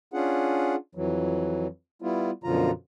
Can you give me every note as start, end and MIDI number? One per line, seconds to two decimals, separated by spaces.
0.14 0.75 61
0.14 0.75 62
0.14 0.75 65
0.14 0.75 68
0.14 0.75 78
0.95 1.67 41
0.95 1.67 52
0.95 1.67 54
2.02 2.31 55
2.02 2.31 59
2.02 2.31 64
2.02 2.31 65
2.44 2.71 42
2.44 2.71 47
2.44 2.71 50
2.44 2.71 53
2.44 2.71 65
2.44 2.71 82